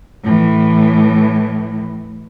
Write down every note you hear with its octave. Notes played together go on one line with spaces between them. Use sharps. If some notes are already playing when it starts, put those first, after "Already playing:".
A2 E3